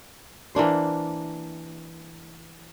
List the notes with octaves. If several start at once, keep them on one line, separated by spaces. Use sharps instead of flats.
E3 A#3 D4 C5